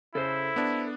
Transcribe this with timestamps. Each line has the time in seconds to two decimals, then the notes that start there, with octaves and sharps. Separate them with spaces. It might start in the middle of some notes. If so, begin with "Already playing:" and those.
0.15 C#3 E4 A4 C5
0.56 B3 D4